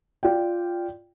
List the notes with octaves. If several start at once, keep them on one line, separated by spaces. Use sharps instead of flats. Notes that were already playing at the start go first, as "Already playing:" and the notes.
F4 D5 G5